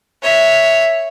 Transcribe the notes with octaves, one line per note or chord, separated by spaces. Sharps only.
C#5 E5